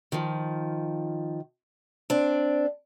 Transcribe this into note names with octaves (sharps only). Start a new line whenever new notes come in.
D#3 F3
C4 D4